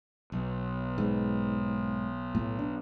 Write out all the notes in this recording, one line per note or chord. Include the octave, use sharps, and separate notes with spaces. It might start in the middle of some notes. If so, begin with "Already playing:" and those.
B1
G#2
A2
D4